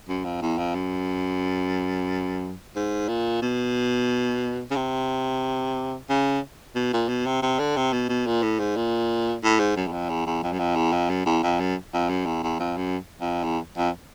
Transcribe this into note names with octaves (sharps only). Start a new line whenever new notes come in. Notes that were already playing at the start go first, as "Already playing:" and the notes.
F#2
F2
E2
F2
F#2
G#2
A#2
B2
C#3
C3
C#3
B2
A#2
B2
C3
C3
D3
C3
B2
B2
A#2
A2
G#2
A#2
A2
G#2
F#2
E2
F2
E2
E2
F2
F#2
F2
E2
F2
F#2
E2
F2
F#2
F2
F#2
E2
E2
F2
F#2
F2
E2
F2